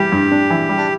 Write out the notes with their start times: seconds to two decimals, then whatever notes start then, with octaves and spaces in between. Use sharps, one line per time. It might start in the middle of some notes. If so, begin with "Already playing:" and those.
Already playing: E3 G3 G4
0.12 G2
0.31 D4
0.50 E3
0.69 G3
0.77 D4